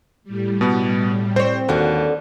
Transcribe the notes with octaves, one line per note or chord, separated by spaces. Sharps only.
A2 G3
B2 B3
C4 C5 C#5
D#2 D3 F#4